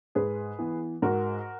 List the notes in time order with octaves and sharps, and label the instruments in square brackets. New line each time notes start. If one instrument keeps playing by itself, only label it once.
[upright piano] G#2 G#4 B4
E3 B3
G#2 F#4 A#4